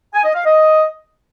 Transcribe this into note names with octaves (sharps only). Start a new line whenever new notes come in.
G#5
D#5
F5
D#5